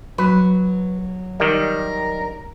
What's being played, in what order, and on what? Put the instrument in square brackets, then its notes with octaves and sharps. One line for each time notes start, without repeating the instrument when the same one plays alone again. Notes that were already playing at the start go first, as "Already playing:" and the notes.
[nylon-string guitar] F#3 [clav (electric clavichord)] B4
[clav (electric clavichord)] D#3 G3 [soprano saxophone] A#4